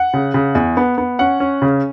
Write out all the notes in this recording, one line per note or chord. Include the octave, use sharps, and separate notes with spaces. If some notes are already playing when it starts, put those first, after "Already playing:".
Already playing: F#5
C#3
C#3
E2
B3
B3
C#4 F#5
C#4
C#3